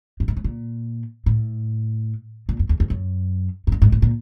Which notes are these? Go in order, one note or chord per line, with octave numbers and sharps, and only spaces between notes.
G2
G#2
A2
A#2
A2
A#2
F#2
E2
F2
F#2
G#2
G2
G#2
A2
A#2